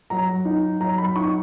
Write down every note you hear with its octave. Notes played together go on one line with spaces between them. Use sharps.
F#3 A#5
D#4
F#3 A#5
B5
D#4 C#6